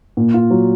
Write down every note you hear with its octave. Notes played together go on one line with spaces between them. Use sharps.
A#2
F4
F#3